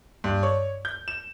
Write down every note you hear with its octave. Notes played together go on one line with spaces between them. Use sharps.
G2
C#5
G6
E7